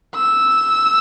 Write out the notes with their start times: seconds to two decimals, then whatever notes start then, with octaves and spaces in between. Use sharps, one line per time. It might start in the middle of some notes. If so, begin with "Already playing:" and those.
0.15 E6